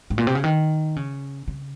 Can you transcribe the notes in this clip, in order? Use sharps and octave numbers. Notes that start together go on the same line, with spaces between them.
G#2
A#2
C3
C#3
D#3
C#3
C#3